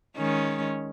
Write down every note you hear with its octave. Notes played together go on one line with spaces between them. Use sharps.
D#3 G#3 C#4